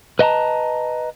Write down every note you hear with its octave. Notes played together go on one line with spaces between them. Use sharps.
B4 D#5 F#5 A5 A#5